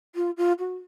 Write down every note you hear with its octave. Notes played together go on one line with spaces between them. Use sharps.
F4
F4
F#4